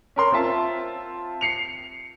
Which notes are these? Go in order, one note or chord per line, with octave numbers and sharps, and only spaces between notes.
C#4 A#4 C6
C4 F4 E5 A5
C7 C#7 F7